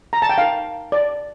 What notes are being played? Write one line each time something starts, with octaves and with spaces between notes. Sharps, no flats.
A#5
A5
G5
D#4 A#4 F5
D5